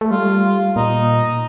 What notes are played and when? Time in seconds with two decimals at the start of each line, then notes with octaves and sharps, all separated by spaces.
0.01 A3
0.11 G3 F4
0.76 A#2 D#4